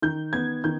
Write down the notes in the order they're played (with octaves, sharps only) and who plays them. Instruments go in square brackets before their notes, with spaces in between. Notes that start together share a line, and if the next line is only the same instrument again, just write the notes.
[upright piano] D#3 G6
B3 G#6
D#3 G6